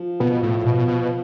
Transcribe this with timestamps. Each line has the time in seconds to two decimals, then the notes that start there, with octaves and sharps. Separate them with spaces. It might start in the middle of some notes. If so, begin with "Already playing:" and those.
Already playing: F3
0.20 B2
0.43 A2
0.65 B2
0.88 B2